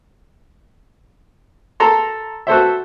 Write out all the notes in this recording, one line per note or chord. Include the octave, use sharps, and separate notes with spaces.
A4 A#5 C6
F#4 A4 C5 E5